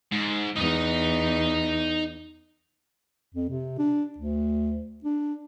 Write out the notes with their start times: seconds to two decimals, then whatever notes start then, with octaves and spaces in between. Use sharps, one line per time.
0.11 G#2
0.56 E2 D#4 D#5
3.34 F2
3.49 C3
3.78 D4
4.18 D2
5.04 D4